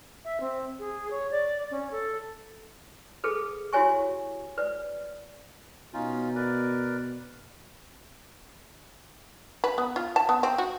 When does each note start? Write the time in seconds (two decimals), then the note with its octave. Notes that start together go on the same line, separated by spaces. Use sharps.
0.24 E5
0.40 C4
0.79 G#4
1.10 C#5
1.31 D5
1.71 C#4
1.91 A4
3.24 G#4 A4 B4
3.73 E4 F#4 G4 C#5 G#5 C#6
4.58 B4 D5
5.94 B2 C#4 D#4 F4
6.35 A#4 B4 D5
9.64 B4
9.78 B3
9.96 F4
10.16 A5
10.29 B3
10.43 C4
10.58 F#4